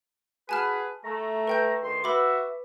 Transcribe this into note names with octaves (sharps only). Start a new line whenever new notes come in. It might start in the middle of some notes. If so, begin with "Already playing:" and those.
F#4 G#4 B4 G#5 A5 F6
A3 A#5
B4 G5 G6
D2 D#3 C6
F#4 B4 E5 B5 D6